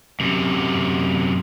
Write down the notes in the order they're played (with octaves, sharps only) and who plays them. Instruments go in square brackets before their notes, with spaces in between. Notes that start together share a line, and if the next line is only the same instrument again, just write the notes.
[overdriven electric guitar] F#2 C3